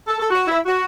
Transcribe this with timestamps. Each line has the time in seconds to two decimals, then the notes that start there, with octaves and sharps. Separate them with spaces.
0.08 A4
0.20 A4
0.31 F#4
0.48 E4
0.65 F#4